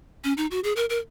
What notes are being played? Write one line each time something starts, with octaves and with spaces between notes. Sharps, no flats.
C#4
D#4
F#4
G#4
A#4
A#4